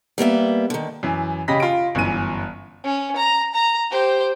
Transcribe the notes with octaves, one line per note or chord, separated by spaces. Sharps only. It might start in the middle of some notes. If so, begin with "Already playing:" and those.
G3 A#3 B3 E5
D3 D#3
F#2 E3
C#3 G4 D#5 B5 A#6 B6
F4 D7
G1 F#2 E3 D#7
C#4
A#5
A#5
G4 C5